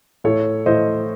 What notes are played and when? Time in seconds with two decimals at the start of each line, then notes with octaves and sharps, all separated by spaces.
0.24 A2 A4 C#5
0.66 A2 C5 D#5